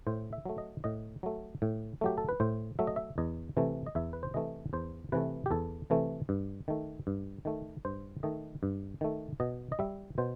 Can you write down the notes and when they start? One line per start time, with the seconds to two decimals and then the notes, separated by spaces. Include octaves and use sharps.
0.07 A2 C5
0.33 E5
0.45 F#3 A3
0.58 D#5
0.84 A2 D#5
1.23 F#3 A3
1.62 A2
2.01 F#3 A3 G4
2.18 A4
2.29 B4
2.40 A2 C5
2.79 F#3 A3 E5
2.87 D#5
2.96 E5
3.18 E2 D#5
3.57 C3 E3 A3
3.86 D#5
3.95 E2 E5
4.13 B4
4.23 C5
4.34 C3 E3 A3 D#5
4.73 E2 C5
5.12 C3 E3 A3 B4
5.46 G4
5.51 E2 A4
5.90 C3 E3 A3
6.29 G2
6.68 D#3 A3
7.07 G2
7.45 D#3 A3
7.85 G2 C5
8.23 D#3 A3 D#5
8.63 G2
9.01 D#3 A3
9.40 B2 D#5
9.72 D#5
9.79 G3 E5
10.18 B2 C5